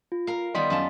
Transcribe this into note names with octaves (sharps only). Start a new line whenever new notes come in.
F4
A#4 F5
D#3 G3 B3 D#5 C6 B6
F#2 F4 A5